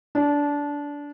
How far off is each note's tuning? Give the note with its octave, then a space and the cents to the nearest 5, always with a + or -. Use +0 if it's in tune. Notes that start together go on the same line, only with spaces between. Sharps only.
D4 -20